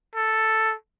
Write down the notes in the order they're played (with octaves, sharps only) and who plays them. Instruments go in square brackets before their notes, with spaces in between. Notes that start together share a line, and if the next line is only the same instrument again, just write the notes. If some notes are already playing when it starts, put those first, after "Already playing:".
[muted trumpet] A4